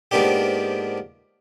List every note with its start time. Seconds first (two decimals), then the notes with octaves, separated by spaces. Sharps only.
0.11 G#2 F3 A#3 B3 D4 G4